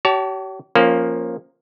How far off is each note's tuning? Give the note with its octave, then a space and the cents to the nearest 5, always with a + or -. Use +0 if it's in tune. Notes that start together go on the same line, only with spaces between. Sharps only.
G4 -45 C#5 +25 A5 +0
F3 +5 A#3 +0 C#4 -15